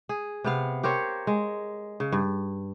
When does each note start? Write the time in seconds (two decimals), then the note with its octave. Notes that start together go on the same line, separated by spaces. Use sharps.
0.09 G#4
0.44 C3 B3 F5
0.83 G4 A#4 C5 C#5
1.27 G#3
2.00 C#3
2.12 G2